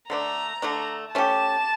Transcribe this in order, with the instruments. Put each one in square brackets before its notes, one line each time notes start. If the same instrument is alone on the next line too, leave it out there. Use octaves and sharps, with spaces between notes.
[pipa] D3 A3 D4 [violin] A#5
[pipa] D3 A3 D4
[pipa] A3 C#4 G4 [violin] A5